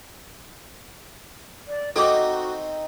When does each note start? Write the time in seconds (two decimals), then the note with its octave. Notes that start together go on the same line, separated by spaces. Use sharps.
1.68 D5
1.96 C4 D#4 F#4 A4 D6